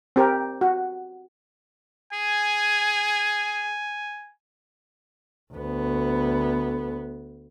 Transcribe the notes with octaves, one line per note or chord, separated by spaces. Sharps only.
C4 G4 A#4
F#4
G#4 G#5
D2 B3